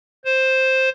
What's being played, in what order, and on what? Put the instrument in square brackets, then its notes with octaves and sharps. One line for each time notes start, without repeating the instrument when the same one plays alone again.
[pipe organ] C5